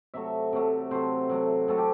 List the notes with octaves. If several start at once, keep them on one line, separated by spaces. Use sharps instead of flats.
C3 F#3 A3 E5
C3 F#3 A3
C3 F#3 A3 C5
C3 F#3 A3
C3 F#3 A3 A4
G4